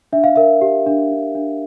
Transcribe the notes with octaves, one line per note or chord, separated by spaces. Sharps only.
D4 E5
F5
A#4 E5
G4
D4
D4
D4